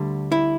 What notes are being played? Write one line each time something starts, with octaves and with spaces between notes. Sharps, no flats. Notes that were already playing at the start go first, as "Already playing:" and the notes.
Already playing: D2 D3 G3
E4